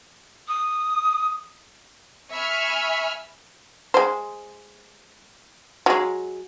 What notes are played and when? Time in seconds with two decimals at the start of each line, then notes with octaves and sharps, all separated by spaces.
0.48 D#6
2.32 E5 G#5 B5 C#6 F6
3.94 G#3 C5
5.86 F#3 G#3